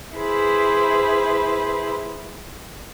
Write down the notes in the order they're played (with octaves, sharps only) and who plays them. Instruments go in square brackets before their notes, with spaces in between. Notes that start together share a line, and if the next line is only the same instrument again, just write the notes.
[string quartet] E4 G#4 B4 C5